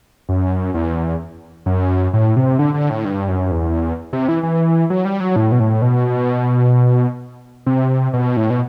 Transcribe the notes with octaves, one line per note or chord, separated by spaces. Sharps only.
F#2
E2
F#2
A2
C3
D3
D3
A2
G2
F#2
E2
C3
E3
E3
F#3
G3
F#3
A2
B2
A2
B2
C3
B2
A2
B2